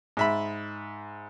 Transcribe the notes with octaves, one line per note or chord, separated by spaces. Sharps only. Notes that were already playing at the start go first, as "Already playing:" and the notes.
G#2 E5 B5